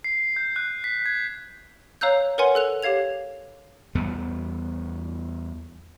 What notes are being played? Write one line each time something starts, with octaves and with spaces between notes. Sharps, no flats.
C7
G6
F#6
B6
G#6
C#5 F5 A#5 E6 F#6 G6
A#4 B4 C#5 F#5 G#5 C6
A4 F#6 F7
G4 C#5 F5 G#6 F7
E2 G3 B3